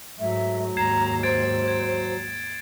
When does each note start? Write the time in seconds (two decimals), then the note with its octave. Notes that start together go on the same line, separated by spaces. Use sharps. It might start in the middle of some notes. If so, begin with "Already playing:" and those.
0.19 G#2 F#3 A3 E5
0.77 D#2 G#2 A#5 G#6 C7 E7
1.23 C5 G#6 A6 D7
1.68 G#6